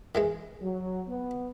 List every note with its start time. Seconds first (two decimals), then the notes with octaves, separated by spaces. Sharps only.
0.15 D#3 E3 G#3
0.62 F#3
1.08 B3